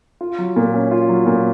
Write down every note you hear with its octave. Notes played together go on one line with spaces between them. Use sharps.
F4
F#3
A#2
C#4
F4
F#3
A#2